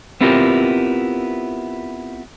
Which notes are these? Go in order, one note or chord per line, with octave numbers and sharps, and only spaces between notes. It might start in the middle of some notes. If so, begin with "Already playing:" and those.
B3 C4 E4 F4 G4 A#4